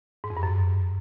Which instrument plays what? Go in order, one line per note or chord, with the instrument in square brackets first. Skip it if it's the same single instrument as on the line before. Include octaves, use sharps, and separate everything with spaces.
[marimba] G#2
F2
G2
F#2